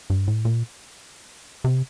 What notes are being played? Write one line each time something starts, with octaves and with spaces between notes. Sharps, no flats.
G2
A2
A#2
C3